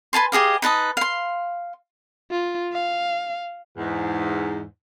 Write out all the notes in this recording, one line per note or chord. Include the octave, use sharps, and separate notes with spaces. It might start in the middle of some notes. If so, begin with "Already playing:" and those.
B4 G#5 A5 C6
G4 G#4 D#5 F5
D#4 B4 A5 D#6
F5 C6
F4
F5
E2 G#2